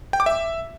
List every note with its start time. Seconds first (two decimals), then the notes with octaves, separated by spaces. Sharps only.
0.13 G5
0.20 D6
0.26 E5